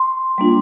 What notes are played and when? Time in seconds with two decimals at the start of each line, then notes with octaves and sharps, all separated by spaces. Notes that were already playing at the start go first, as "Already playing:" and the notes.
Already playing: C6
0.38 G3 A#3 D4 F4